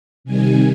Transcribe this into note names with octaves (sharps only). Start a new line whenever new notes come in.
C3 D#3 G3 G#5